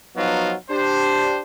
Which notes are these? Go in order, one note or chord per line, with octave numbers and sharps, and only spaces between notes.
F3 F#3 B3 D#4 F4 F#4
D4 G4 C5